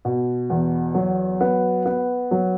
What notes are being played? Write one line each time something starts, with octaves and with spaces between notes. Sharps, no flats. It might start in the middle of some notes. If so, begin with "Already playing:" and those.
B2
E2
F#3
B3
B3
F#3